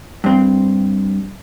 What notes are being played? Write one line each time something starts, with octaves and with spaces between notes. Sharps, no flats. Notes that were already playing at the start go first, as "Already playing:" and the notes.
G2 C4